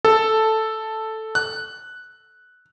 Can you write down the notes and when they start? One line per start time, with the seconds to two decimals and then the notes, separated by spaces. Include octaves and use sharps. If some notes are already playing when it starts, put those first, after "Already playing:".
0.05 A4
1.35 F#6